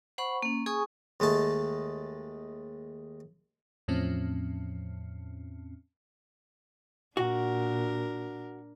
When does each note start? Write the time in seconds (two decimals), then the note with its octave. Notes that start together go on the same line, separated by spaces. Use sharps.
0.18 C5 F#5 B5 C#6
0.42 A#3 C#4
0.66 G#4 G#5 C#6 D#6
1.20 D#2 G#3 A3 A5
3.88 E2 A2 F3 C4 C#4
7.17 A#2 D4 F#4 A#4